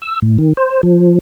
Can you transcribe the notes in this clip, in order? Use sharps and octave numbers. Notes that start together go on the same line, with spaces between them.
E6
A2
D#3
C5
F3